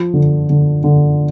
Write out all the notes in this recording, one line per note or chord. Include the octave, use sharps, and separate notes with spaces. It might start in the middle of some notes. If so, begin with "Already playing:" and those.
Already playing: F3
D3
D3
D3